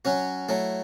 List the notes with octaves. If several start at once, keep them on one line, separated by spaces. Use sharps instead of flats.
F#3 C#4 F#4
F#3 A3 E4